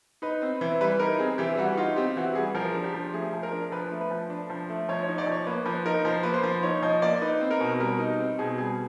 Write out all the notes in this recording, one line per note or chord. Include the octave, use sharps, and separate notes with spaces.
D#4 B4
C4
E3
G3 B4
D#4 A#4
C4 G#4
E3 G4
G3 F#4
D#4 F4
C4 G4
E3 F#4
G3 G#4
F3 A#4
D4
G4
F3
A3 G#4
F3
A#4
D4
F3 B4
A3
B4
F3
D4
F3
A3
F3 C#5
C#5
D#4
D5
F3 C#5
A#3 B4
F3 B4
D#4 A#4
F3 C5
A#3 B4
C5
F3
D#4 C#5
F3 D#5
A#3 D5
D#4 B4
C4
A#4
B2
G3 A#4
D#4
C4
B2 G#4
G3 G#4